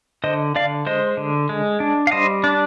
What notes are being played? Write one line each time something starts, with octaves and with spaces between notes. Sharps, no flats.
D3 C5 D#5
D3 D5 F5
G#3 C5 D#5
D3
G#3
D4
F5
G3 C5 D#5
D4